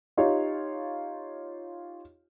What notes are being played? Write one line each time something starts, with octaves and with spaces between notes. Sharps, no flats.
D#4 F4 G4 C#5